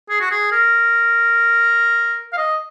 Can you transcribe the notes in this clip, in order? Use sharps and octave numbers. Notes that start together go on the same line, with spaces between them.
G#4
F#4
G#4
A#4
F5
D#5